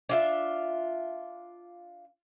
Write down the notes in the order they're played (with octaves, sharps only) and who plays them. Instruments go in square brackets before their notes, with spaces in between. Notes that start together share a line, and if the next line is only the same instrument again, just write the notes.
[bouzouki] D4 F4 E5